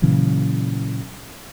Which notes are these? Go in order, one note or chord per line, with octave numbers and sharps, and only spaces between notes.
A#2 C#3 E3 F#3